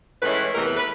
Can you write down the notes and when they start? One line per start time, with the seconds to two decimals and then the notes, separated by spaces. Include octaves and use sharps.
0.22 A2 E3 G#3 C#4 E4 B4
0.55 E2 C3 E3 A3 A#4
0.66 B4
0.77 B4